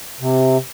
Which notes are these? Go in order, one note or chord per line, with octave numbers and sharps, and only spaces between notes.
C3